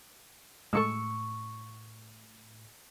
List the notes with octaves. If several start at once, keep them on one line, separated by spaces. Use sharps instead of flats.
A2 G#3 A4 C#6 E6